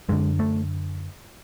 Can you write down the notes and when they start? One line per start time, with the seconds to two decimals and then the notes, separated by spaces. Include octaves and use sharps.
0.09 F#2 D3 G#3
0.39 A3